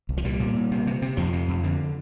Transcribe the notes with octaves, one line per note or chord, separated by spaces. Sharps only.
C2
F3
A#2 G3
A#2
A#2
C3
C3
C3
F2 F3
C3
F2
D3